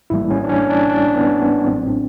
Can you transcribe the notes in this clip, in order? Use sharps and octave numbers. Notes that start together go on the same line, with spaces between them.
A1 A2 E3 G3 A#3 E4
C#4
D4
C#4
D4
D4
B3
B3
A1 A2 F#3 A#3 C4
D4